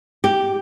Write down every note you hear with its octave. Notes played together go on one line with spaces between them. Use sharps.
G4